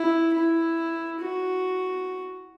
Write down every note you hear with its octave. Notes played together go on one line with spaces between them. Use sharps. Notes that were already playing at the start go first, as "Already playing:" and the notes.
Already playing: E4
E4
F#4